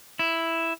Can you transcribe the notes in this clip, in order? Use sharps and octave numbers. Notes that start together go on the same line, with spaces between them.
E4